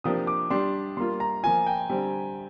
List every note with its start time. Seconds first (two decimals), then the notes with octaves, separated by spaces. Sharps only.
0.04 C3 F3 A#3 D4 G4 D#6
0.27 D6
0.50 G3 D4 G4 C6
0.97 G3 A#3 F4 C6
1.20 A#5
1.43 F3 A#3 F4 G#5
1.67 G5
1.89 D3 G3 C4 G4